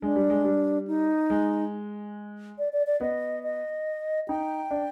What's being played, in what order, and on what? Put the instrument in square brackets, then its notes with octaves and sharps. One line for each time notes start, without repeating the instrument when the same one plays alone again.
[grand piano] G#3 [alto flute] D4
[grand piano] G3
G#3
G3
[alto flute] D#4
[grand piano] G#3
[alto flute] D5
D5
D5
[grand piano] B3 [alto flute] D#5
[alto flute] D#5
[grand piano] D#4 [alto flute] G5
[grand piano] D4